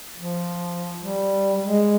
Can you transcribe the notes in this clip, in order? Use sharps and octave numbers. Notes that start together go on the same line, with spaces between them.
F3
G3
G#3